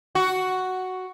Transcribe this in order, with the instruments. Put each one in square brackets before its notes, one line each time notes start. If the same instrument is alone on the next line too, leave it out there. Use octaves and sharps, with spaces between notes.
[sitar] F#4